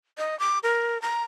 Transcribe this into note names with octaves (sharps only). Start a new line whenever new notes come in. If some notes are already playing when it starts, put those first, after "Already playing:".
D#5
D6
A#4
A#5